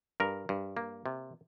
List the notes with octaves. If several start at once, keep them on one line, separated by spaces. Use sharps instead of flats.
G2 A#4
G2
A#3
C3